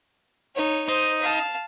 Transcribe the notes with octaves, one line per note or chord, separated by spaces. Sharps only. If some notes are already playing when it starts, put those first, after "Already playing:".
D#4 C#5
D#4 C5
F5 A5